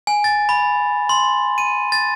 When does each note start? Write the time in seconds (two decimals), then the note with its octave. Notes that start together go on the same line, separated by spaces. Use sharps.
0.07 G#5
0.24 A6
0.49 B5
1.09 C6
1.58 D#7
1.92 A6